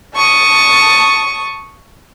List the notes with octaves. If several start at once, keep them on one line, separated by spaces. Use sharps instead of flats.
A5 C#6 D#6